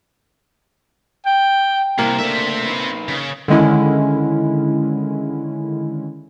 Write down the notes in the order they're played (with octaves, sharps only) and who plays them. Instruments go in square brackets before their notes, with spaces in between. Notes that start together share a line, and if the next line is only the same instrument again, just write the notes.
[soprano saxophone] G5
[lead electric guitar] C2 [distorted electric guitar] C3 [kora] A#3
[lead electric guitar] A3 D4 [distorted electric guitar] C4 E5
[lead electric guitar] D#4 B4
[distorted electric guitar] C#3
[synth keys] D3 D#3 G#3 C#4 E4